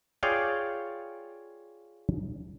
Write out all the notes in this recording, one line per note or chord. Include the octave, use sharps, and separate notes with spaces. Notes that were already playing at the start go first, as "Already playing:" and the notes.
F4 G#4 C#5 D5 F5 G5